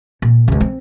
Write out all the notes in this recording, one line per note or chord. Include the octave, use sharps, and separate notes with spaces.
A#2
C#2 C3
C4